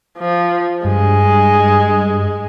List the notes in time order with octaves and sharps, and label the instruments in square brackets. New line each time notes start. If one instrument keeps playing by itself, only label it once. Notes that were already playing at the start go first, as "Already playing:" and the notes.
[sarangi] F3
[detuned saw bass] G2 [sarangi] G#3